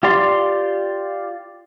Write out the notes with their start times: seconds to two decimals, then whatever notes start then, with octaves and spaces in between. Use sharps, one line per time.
0.03 F4 G4 D5 C6